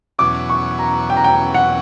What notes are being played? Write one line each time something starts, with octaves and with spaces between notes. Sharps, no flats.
E2 B2 F#3 C#4 D6
C#6
A#5
G5
A#5
G5
F#5